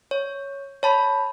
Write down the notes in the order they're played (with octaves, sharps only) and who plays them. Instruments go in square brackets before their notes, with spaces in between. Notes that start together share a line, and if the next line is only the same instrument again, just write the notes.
[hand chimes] C#5
C#5 A5 B5